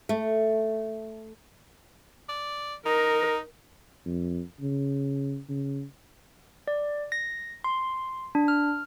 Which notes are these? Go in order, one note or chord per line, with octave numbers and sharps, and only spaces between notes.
A3
D5
D#4 A#4
F2
C#3
C#3
D5
A#6
C6
D4
F6